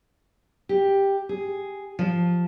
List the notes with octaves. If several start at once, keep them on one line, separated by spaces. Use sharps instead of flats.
G4
G#4
F3